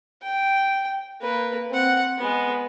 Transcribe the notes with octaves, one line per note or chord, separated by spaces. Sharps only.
G5
A#3 B4
C4 F#5
G#3 B3